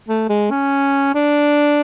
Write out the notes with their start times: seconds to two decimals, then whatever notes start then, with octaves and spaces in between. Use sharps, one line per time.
0.09 A3
0.29 G#3
0.51 C#4
1.15 D4